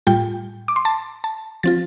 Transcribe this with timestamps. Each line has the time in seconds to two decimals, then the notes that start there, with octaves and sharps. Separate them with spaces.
0.07 A2 G3 F4 G5
0.68 D6
0.76 C6
0.85 A5
1.24 A5
1.63 F3 C4 F4 A6